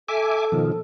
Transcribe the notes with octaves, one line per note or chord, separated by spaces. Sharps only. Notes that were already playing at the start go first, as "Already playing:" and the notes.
A4 E5 G#5 D6
B2 D#3 F3